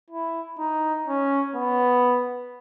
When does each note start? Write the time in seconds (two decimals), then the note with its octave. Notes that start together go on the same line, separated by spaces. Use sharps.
0.10 E4
0.59 D#4
1.07 C#4
1.55 B3